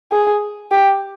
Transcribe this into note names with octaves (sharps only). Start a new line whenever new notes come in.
G#4
G4